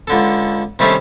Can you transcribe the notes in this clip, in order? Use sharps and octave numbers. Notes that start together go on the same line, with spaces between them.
C#2 D3 A4
C3 D#3 G3 A3 C4 C#4